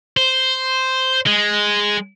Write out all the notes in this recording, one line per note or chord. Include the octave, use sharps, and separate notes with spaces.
C5
G#3